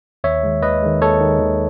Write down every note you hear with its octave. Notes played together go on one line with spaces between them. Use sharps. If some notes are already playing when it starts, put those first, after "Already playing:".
D#2 C#5 E5
D#3 G#3
D#2 B4 D#5
D#3 G#3
D#2 A4 C#5
D#3 G#3
D#2